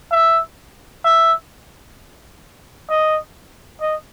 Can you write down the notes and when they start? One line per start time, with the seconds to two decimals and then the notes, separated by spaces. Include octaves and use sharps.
0.12 E5
1.05 E5
2.90 D#5
3.81 D#5